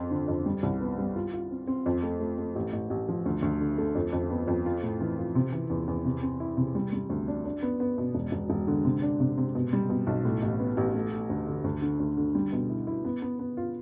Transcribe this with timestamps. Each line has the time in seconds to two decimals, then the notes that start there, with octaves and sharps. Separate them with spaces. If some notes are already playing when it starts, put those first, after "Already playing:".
Already playing: F2 C4
0.11 D3
0.28 F2
0.46 G3
0.63 C2
0.81 B3
0.98 G3
1.16 F4
1.33 F4
1.51 C4
1.67 C4
1.86 F2
2.03 A3
2.20 A3
2.38 A3
2.55 A1
2.73 A1
2.90 A1
3.09 F3
3.26 D2
3.42 D2
3.60 D3
3.78 A3
3.95 F2
4.13 F2
4.30 B3
4.48 F2
4.66 F4
4.83 A2
5.01 E3
5.18 F4
5.35 C3
5.52 E3
5.70 E2
5.88 E2
6.05 C3
6.23 C4
6.40 E4
6.57 C3
6.75 G3
6.93 G3
7.10 D2
7.28 D4
7.45 D4
7.63 B3
7.80 B3
7.98 B2
8.15 E1
8.32 E1
8.50 E1
8.67 D3
8.85 C3
9.02 D4
9.20 C3
9.38 C3
9.55 B2
9.73 G3
9.89 B2
10.07 B1
10.25 A2
10.42 A1
10.59 B3
10.77 A1
10.95 A3
11.12 A3
11.30 D2
11.47 D3
11.64 D2
11.82 D3
12.00 D2
12.17 D3
12.35 G3
12.52 B2
12.70 E4
12.87 E4
13.05 B3
13.22 B3
13.39 B3
13.57 F4